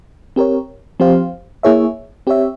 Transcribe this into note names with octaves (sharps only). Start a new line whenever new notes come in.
C4 G4 A#4 C#5
F3 C4 G4 C5 F5
A#3 E4 G#4 C#5 E5
C4 G4 C#5 E5